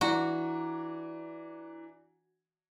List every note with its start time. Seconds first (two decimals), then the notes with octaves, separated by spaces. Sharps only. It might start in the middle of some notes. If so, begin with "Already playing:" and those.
0.01 E3 D4 F#4 A#5